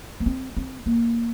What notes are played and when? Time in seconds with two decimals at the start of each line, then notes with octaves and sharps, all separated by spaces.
0.20 A#3
0.26 C4
0.57 C4
0.86 A#3